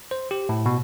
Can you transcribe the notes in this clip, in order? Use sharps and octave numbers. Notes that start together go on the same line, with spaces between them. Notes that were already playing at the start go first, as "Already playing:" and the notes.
C5
G4
A2
B2